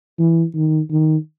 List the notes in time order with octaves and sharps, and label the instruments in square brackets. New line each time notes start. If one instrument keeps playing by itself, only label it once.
[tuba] E3
D#3
D#3